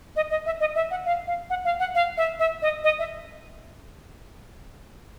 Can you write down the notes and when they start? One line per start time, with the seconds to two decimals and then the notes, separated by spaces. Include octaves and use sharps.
0.16 D#5
0.30 D#5
0.46 E5
0.61 D#5
0.75 E5
0.91 F#5
1.05 F5
1.27 F5
1.50 F#5
1.65 F5
1.80 F#5
1.95 F5
2.17 E5
2.39 E5
2.62 D#5
2.84 D#5
2.99 E5